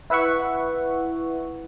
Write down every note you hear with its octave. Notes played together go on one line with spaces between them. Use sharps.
E4 B4 E5 F#5 C#6